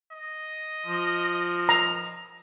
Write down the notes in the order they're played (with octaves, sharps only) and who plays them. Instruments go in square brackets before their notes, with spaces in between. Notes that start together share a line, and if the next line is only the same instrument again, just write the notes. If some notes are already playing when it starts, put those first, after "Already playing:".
[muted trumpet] D#5
[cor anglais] F3
[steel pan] A#5